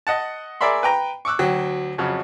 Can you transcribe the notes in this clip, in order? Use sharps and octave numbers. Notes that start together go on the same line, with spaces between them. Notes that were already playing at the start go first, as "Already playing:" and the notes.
D#5 F#5 A5
G#4 A#4 D5 E5 B5 C6
B4 G5 A#5
C#6 D6 E6 F#6
D2 F#3 G5
F2 C#3 F#3